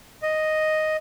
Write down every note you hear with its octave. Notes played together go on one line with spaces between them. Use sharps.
D#5